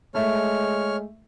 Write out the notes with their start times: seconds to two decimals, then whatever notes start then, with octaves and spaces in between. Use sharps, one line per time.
0.15 G#3 A3 C#5 E5 F6